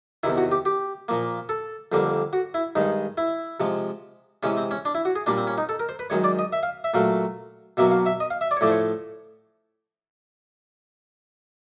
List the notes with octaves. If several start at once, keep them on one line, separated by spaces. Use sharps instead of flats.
E2 C3 D#3 E4
F#4
G4
G4
A#2 F3 A#3
A4
F2 D3 G3 A#3
F#4
E4
G2 D#3 G#3 D#4
E4
C3 F3 G#3
C3 E3 G#3 C#4
C4
C#4
D4
E4
F#4
G#4
A#2 G3 A#3 D4
C4
C#4
D#4
A4
A#4
C5
B4
F#2 D#3 G#3 C#5
D5
D#5
E5
F5
E5
A#2 F#3 A3 F5
B2 F#3 A#3 E5
F5
E5
D#5
F5
E5
D5
C#5
A2 F3 A3 D5
C5
C#5